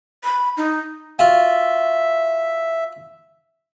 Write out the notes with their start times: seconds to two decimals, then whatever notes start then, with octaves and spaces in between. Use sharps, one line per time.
0.24 B5
0.57 D#4
1.19 F4 F#4 E5